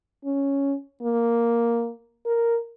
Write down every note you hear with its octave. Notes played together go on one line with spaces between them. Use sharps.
C#4
A#3
A#4